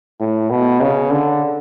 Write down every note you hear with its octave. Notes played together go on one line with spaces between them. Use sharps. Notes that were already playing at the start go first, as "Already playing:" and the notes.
A2
B2
C#3
D3